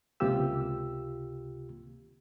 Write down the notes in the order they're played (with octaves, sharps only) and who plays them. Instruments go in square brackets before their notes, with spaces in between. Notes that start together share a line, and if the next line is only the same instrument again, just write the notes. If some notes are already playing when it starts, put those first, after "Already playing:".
[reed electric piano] C#2 C3 A#3 F4 G4 E6